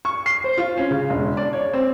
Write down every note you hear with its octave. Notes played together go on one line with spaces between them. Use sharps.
C#6
C7
C5
F4
C#4
C#3
E1
D5
C#5
C4